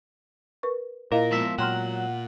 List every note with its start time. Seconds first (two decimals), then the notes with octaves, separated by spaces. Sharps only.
0.63 A#4 B4 C#6
1.12 A#2 E4 A#4 D#5 F5
1.32 F3 G#3 B3 E5
1.58 A#2 F#3 F#5 G5 C6 F6